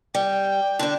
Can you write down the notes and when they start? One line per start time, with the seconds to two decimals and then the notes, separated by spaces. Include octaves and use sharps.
0.14 G3 G5
0.79 D3 D4